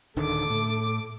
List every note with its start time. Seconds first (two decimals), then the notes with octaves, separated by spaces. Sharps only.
0.16 D1 D3 D#3 A4 D6
0.50 A2